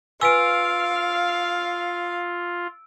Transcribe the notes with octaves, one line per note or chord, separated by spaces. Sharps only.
F4 B4 F5 G#5 E6 D7